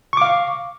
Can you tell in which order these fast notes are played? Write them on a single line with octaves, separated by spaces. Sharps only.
C#6 D6 F5